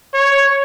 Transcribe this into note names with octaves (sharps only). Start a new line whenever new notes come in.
C#5